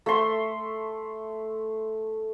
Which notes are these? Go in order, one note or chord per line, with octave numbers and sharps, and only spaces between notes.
A3 C6